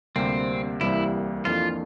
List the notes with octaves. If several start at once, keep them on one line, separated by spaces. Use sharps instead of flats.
D2 C3 G3 A#3 C4
C2 C3 E3 G3 A#3 E4
F2 E3 A#3 D4 F4 A4